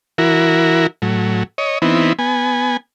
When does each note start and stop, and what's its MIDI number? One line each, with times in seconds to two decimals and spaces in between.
0.18 0.87 52
0.18 0.87 64
0.18 0.87 66
0.18 0.87 70
1.02 1.43 45
1.02 1.43 54
1.58 1.79 73
1.58 1.79 75
1.82 2.13 52
1.82 2.13 59
1.82 2.13 60
1.82 2.13 63
1.82 2.13 64
2.19 2.77 59
2.19 2.77 80